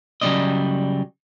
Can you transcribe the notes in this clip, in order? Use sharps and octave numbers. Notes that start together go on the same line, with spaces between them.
C#3 F#3 G3 B3 D5 D#5